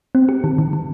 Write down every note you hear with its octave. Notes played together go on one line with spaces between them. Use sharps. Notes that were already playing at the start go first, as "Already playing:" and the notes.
C4
G4
D#3
D#3
D#3